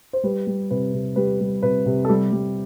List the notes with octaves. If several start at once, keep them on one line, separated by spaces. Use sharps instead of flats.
C5
G3 B4
G3
C3 B4
C3
G3 B4
G3
C3 B4
C3
A4
G3 G4
G3